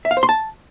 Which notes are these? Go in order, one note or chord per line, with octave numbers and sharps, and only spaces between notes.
E5
F5
C5
C6
A5